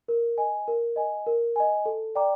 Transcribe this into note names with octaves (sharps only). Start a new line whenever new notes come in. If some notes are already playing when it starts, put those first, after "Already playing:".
A#4
D#5 G#5
A#4
D#5 G#5
A#4
D#5 G#5
A4
D5 G5 A#5 D6